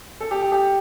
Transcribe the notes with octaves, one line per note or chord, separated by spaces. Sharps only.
A4
G4
G4
G4